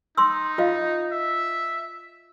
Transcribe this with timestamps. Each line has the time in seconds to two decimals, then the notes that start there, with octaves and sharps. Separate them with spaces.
0.17 D#4 C6 E6
0.58 F4 D#5 F5
1.12 E5